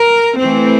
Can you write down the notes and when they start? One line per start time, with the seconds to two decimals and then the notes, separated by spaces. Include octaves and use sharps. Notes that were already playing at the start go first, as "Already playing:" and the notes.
Already playing: A#4
0.39 E3 A3 C4